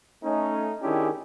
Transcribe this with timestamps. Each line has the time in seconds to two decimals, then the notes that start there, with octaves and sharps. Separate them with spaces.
0.24 A3 C#4 D#4
0.83 D#3 C#4 D4 E4 G4 G#4